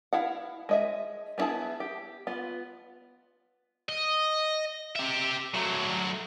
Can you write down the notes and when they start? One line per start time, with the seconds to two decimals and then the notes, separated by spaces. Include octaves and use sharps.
0.13 E4 F5 F#5
0.69 G#3 D#5 E5
1.38 B3 C#4 E4 G#4 A5
1.80 G4
2.27 B3 F4
3.89 D#5
4.96 G4 E5
5.54 F#3 A3